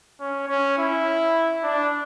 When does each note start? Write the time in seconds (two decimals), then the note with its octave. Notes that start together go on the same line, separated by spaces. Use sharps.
0.20 C#4
0.48 C#4
0.78 E4
1.64 D4